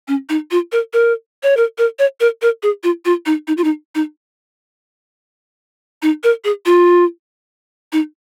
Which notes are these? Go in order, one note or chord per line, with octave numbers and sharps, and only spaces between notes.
C#4
D#4
F4
A#4
A#4
C#5
A#4
A#4
C#5
A#4
A#4
G#4
F4
F4
D#4
D#4
F4
D#4
D#4
D#4
A#4
G#4
F4
D#4